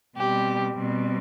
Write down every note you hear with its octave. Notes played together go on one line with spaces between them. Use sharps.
B2 G3 C4 G4
B2 G3 C4